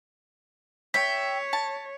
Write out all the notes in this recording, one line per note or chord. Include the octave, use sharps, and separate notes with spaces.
C#5 E5 G5 B6
A5